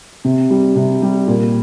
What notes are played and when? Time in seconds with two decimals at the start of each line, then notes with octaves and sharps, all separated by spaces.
0.25 C3
0.50 G3
0.76 C3
1.02 G3
1.28 A#2